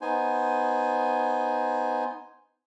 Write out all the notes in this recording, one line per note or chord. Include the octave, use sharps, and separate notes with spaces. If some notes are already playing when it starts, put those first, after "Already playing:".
B3 D#4 C5 G#5